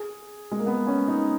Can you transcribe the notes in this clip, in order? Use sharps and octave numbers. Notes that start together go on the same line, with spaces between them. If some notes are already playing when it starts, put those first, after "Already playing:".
Already playing: G#4
G#3
A#3
B3
C#4
D#4